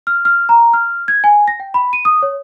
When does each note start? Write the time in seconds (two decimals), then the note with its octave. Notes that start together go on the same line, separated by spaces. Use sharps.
0.07 F6
0.25 F6
0.49 A#5
0.73 F6
1.08 G#6
1.24 G#5
1.48 A#6
1.60 G5
1.74 B5
1.93 D#7
2.05 D#6
2.22 C#5